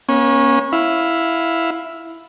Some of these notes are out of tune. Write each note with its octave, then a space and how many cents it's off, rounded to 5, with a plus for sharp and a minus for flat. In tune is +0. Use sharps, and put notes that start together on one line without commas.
A#3 +45 C#4 -15
E4 +0 F5 +10